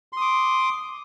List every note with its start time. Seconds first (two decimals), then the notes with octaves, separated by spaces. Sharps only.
0.13 C6
0.17 D#6
0.21 D6